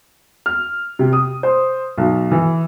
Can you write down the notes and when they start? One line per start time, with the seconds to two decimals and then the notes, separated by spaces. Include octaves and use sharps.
0.46 F6
0.99 C3
1.13 D#6
1.43 C5
1.98 B1
2.31 E3